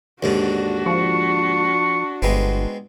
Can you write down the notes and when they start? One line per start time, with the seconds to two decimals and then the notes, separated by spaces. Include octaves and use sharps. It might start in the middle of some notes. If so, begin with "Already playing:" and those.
0.23 D#2 G#2 D3 D4 F#4
0.86 F3 C#6
2.22 G1 G#3 B3 C4